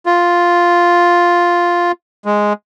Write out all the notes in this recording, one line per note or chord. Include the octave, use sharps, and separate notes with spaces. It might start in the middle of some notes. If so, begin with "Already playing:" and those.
F4
G#3